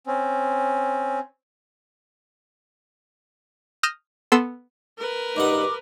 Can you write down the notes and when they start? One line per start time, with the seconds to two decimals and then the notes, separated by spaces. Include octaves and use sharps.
0.07 C4 C#4
3.83 D#6 F6 G6 A#6 E7
4.32 B3 A4 C6 E6 E7
4.98 A#4 B4
5.36 C#2 G2 D#4 F#5 D6